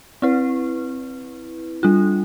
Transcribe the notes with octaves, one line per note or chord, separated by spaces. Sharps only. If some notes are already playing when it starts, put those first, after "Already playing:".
C4 E4 B4
G3 D4 F4